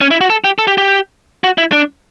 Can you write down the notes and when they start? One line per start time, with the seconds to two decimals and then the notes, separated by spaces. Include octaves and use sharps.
0.01 C#4
0.11 E4
0.21 F#4
0.30 A4
0.44 G4
0.59 A4
0.67 G4
0.78 G4
1.44 F#4
1.58 E4
1.72 D4